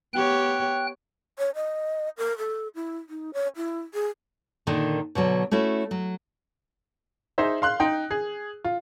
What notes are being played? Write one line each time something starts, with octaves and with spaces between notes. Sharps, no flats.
B3 G4 C#5 G5 F#6
C#5
D#5
A#4
A4
E4
D#4
C#5
E4
G#4
A#2 D3 D#3 A#4
B2 D3 F#3
A3 C#4 E4 F#4
F#3
D#4 G#4 C5 E5
F5 C6 F#6
D#4 G5
G#4
F4